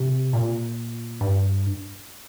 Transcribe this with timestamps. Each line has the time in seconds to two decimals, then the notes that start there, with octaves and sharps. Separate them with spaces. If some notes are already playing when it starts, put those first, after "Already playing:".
Already playing: C3
0.33 A#2
1.21 G2